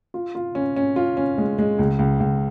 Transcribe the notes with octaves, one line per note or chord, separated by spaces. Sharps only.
F4
F4
C#4
C#4
F4
C#4
G#3
G#3
C#2
C#2
C#2